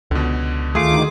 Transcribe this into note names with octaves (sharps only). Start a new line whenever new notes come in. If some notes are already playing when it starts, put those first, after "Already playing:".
C#2 B2 D3
D2 D#3 A3 F4 G#4 D6